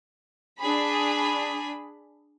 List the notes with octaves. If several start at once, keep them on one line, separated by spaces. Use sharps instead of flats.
D4 G#4 B5